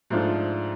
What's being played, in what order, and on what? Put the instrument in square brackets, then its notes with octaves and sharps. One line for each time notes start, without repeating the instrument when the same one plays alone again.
[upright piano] G#2 F3 A3 D4 F4